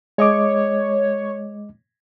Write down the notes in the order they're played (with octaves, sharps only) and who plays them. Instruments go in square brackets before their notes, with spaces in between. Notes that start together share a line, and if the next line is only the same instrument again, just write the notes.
[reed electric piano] G#3 D#5 D6 [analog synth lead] C#5